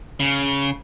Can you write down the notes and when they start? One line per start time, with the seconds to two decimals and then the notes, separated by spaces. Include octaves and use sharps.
0.20 C#3